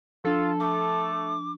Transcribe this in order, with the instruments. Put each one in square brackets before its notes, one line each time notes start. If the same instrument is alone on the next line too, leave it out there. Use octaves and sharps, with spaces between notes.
[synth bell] F3 D4 [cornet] F4 [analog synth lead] A4
[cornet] A3 [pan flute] D6